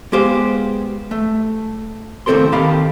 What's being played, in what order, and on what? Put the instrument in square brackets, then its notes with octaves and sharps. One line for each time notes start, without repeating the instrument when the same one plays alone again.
[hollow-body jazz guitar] G#3 B3 G4 C5 F5
A3
D#2 A2 C4 A4 A#4 C6
D#2 D#3 G4 A4 F5 B5